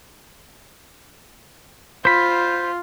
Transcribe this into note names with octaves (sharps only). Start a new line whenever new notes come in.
F4 C5 B5